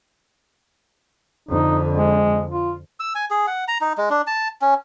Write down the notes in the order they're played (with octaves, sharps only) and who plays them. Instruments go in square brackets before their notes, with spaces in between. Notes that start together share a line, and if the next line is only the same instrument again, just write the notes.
[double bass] F2 D3 [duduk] D#4
[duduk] G#3
F4
[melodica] E6
G#5
G#4
F#5
A#5
D#4
G#3
D4
A5
C#4